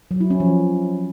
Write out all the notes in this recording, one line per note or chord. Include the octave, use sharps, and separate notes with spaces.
F#3
E4
C#4
F3